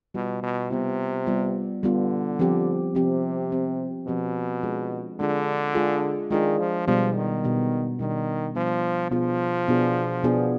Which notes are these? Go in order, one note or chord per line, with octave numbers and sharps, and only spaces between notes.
B2 G3 B3 F4
B2
C3 G3 B3 F4
G3 B3 F4
D3 G3 B3 F4
F3 C4 G4
C3 F3 C4 G4
F3 C4 G4
B2 F3 C4 G4
G#3 D4 F4 G#4
D3 G#3 D4 F4 G#4
G#3 D4 F4 G#4
D#3 G#3 D4 F4 G#4
F3
B2 F3 G3 B3 D4
D#3
B2 G3 B3 D4
B2 D#3 G3 B3 D4
B2 F3 G3 B3 D4
B2 F3 B3 D4 F4 G#4
B2 B3 D4 F4 G#4
B2 B3 D4 F4 G#4